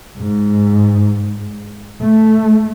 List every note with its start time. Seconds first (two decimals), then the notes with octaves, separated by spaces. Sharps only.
0.18 G#2
2.00 A3